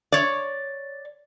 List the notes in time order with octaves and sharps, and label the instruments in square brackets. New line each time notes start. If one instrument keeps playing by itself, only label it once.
[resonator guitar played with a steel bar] C#5 D5